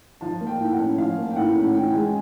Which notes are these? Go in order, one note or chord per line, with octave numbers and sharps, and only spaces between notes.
F3 A5
A#3
G5
A2
F#5
C#4
F3 F5
A#3
G5
A2 F#5
C#4
E3 G5
G#3 G#5